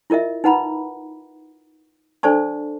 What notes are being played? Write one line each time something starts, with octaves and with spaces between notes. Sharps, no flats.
E4 F4 A#4 D#5 E5
D#4 B4 F#5 A#5 B5
D4 A4 C5 D5 A5 C#6